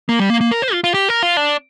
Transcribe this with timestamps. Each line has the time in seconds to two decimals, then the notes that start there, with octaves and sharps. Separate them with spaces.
0.09 A#3
0.19 G3
0.30 A#3
0.41 A#3
0.51 A#4
0.62 C5
0.73 F4
0.84 F4
0.94 G4
1.09 A#4
1.22 F4
1.37 D4